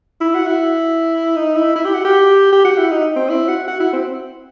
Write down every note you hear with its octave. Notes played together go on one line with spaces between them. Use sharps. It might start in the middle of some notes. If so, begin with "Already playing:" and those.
E4
F#4
E4
D#4
E4
E4
G4
F#4
G4
G4
F#4
E4
D#4
C4
E4
F#4
F#4
E4
C4